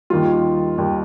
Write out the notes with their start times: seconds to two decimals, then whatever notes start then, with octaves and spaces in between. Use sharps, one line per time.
0.10 D#2 D#3 G3 F4
0.78 D#2 D#3 G3